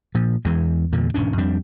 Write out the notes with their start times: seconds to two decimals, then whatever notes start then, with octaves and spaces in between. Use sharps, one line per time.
0.15 A#2 F3
0.45 E2 E3 G#3
0.92 E2 G2 A#2 D3
1.14 E1 G#2 C#4 D4
1.38 F2 G3 C4 D4